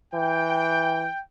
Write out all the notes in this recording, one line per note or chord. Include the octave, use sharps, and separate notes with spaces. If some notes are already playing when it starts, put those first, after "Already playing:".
E3 G5